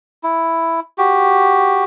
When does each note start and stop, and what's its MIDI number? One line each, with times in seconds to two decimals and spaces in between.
0.23 0.80 64
0.98 1.84 66
0.98 1.84 67